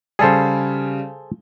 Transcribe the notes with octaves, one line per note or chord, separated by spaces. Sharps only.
C#3 G3 G#4 A4 C5